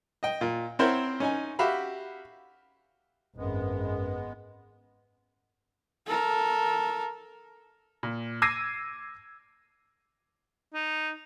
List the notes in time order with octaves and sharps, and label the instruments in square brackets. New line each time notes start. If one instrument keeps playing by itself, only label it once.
[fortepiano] D#5 G5
A#2
C4 E4 A#4 C5 C#5 F#5
C#4 D#4 G#5
F#4 G4 E5 F5 B5
[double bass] G#1 [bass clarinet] F#2 [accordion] G#3 B3
[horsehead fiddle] A4 A#4
[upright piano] A#2
D6 E6 G#6 A#6 C7 D#7
[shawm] D#4